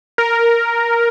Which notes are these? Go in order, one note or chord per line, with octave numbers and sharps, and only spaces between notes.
A#4